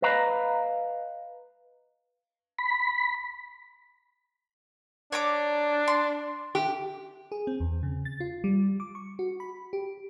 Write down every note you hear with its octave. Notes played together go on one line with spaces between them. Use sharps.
B4 D#5 F5 A#5 B5
B5
D4 C#5 A#5 D6
C6
G4
G#4
C4
E2
C#3
A6
F4
G3
D6
C#6
F#4
B5
G4